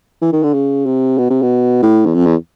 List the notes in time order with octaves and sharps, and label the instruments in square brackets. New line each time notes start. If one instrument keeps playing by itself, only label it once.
[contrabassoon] E3
D#3
D3
C#3
C3
B2
C3
B2
A2
E2
F2
E2